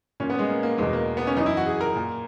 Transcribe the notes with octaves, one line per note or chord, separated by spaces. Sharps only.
A#2 C#4
B3
G#3
A#3
A#3
E2 B2 G#3
A#3
B3
C#4
F#2 E3 D#4
E4
F#4
G#4
A#4
A#2